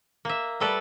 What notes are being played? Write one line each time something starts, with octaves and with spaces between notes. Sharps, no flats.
A#3 E5
G3 A3 A4 B4 D5